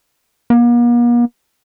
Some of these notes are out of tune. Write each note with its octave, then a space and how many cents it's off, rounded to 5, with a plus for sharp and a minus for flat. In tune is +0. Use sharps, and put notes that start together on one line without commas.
A#3 +45